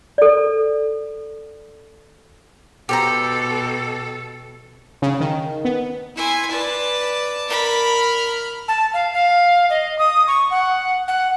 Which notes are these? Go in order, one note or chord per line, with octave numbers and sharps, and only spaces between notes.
A4 D5
B2 G4 A4 C5 A#5
C#3
D#3
B3
E4 G#5 C6
B4 D5 A5
A#4 B5
A#5 F6
A5
F5
F5
D#5
D#6
C#6
F#5
F#5